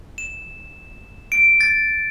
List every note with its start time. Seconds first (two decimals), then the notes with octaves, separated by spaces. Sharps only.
0.18 E7
1.32 D7
1.61 A6